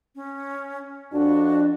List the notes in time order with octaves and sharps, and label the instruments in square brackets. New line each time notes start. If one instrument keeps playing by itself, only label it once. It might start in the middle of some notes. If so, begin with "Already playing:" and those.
[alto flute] C#4
[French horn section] F2 D4 [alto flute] F#4